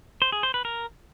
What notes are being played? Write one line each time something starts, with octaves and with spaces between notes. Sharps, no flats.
C5
G#4
C5
B4
A#4